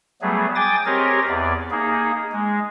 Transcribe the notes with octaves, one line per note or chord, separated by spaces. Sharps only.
F#3 G3 A3 B3 G#4
G5 G#5 D6 D#6 A6
C4 G4 G#4 A#4 C#5 D#5
E2 D5
A#3 D#4 G#4
G#3